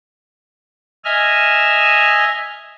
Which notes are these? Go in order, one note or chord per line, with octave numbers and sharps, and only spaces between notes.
D#5 E5 G#5 F6